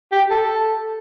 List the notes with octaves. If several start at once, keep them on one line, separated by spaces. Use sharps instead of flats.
G4
A4